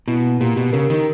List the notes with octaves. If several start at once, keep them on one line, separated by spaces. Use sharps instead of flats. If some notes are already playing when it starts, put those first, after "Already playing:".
B2 E4
A#3
A#2 G4
B2 G4
C#3 A#4
D#3 A#4